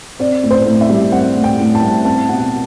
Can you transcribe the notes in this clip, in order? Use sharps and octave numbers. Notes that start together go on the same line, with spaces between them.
C4 D5
A2
C5
A2
E5
G3
C4 F#5
A2
G5
A2
A5
G3
C4 A5
B2 F#5